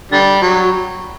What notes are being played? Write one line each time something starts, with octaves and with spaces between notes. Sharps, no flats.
D3 G3
F#3